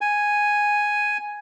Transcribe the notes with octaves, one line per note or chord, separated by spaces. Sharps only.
G#5